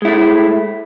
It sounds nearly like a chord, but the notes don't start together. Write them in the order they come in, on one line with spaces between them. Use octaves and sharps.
G#3 E4 A3